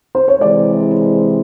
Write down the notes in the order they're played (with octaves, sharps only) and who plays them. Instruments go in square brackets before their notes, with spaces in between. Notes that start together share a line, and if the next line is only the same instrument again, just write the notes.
[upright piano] C5
C#5
[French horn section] C3 E3 G#3 [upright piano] D5